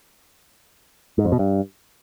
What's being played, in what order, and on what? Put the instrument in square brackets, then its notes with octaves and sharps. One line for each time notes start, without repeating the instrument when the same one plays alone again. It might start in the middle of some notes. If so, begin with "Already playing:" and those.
[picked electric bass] G#2
F2
B2
G2